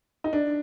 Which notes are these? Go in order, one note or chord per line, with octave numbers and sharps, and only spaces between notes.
D#4
D4